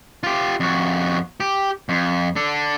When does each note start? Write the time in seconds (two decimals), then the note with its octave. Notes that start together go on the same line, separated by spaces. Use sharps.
0.23 F4 G4
0.60 F2 F#4
1.40 G4
1.89 F2
2.36 D4 A4